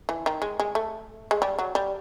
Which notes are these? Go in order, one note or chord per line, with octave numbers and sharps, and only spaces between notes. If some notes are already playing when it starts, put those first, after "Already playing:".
E3
D#3
G#3
G#3
A3
G#3
G3
F#3
G3